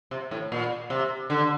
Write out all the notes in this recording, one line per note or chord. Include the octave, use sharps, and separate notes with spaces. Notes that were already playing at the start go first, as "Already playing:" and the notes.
C3
A2
A#2
C3
D3